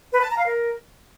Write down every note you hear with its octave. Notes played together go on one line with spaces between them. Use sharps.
B4
A5
A#5
F5
A#4